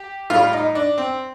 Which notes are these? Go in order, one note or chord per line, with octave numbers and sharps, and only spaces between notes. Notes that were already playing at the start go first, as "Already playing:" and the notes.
Already playing: G4
A2 G3 F4
D#4
D4
C4